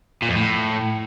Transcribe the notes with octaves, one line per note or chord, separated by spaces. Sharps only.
A#2
F2
A2